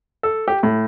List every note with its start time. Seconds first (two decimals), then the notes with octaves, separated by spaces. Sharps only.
0.23 A4
0.48 G4
0.63 A2